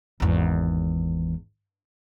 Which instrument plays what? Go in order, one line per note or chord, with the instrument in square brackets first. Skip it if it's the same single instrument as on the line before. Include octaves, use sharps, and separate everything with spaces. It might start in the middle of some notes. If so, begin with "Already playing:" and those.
[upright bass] G#1 E2